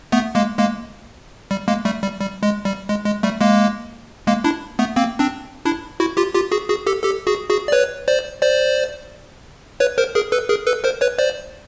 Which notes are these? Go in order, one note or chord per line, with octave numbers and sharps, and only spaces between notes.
A3 B3
G#3 A#3
G#3 A#3
G3
G#3 A#3
G3 A3
G3
G3
G#3
G3
G#3
G#3
G3 A3
G#3 A#3
G#3 A#3
D4 E4
A3 B3
A#3 C4
C4 D4
D4 E4
E4 F#4
F4 G4
F4 G4
F#4 G#4
F#4 G#4
G4 A4
G4 A4
F#4 G#4
F#4 G#4
D5
B4 C#5
C5 D5
C5 D5
B4 C#5
A#4 C5
G#4 A#4
A4 B4
G#4 A#4
A4 B4
A#4 C5
B4 C#5
C5 D5